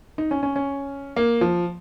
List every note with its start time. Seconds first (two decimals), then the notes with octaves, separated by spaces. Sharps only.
0.18 D#4
0.31 C#4
0.43 C#4
0.56 C#4
1.16 A#3
1.41 F3